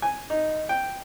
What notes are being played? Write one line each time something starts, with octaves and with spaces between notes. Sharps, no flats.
G#5
D#4
G5